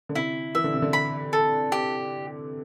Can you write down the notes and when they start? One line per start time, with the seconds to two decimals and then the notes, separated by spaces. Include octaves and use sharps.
0.09 D3
0.15 C3 E4
0.55 E3 E5
0.64 D3
0.73 C3
0.82 D3
0.93 B5
1.33 A4
1.72 G4